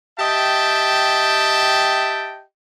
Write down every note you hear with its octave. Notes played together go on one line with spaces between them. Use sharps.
G4 D#5 E5 G5 A5